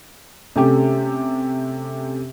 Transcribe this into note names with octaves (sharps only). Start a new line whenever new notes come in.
C3 A3 C#4 G4 A4